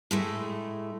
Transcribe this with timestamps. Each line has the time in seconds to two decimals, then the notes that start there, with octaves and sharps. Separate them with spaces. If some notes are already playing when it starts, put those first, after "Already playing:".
0.11 A2 G#3 A3